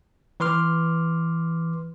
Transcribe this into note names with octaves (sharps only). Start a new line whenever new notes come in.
E3 B4 C6 D6 F6